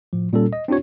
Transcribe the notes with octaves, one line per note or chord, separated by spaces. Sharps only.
A2 F3
A#2 G3 C#4 A4
D#5
C4 D4 E4 F#4 C#5